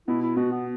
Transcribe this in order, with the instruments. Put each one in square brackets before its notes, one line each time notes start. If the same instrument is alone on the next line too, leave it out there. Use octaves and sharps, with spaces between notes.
[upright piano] B2 [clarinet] E4
[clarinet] E4
[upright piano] B2 [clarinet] F#4
[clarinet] B3